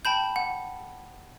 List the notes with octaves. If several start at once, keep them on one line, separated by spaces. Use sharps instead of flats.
G5 A5 B5 G6
F#5